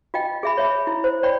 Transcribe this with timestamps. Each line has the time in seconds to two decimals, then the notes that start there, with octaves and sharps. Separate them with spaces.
0.14 F4 D#5 G5
0.43 G#4 E5 B5
0.57 C#5 E5 B5
0.87 E4
1.04 C5
1.23 C#5 D5 G5 B5